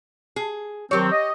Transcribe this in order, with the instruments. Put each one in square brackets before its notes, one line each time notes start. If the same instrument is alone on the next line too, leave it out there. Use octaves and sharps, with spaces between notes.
[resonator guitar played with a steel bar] G#4
[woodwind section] D#3 F#3 C4 [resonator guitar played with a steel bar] G4 C#5
[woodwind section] D#5